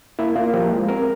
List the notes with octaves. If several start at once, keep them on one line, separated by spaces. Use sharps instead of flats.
A#3 E4
A#3 F4
F3 G4
G#3
C4 A#4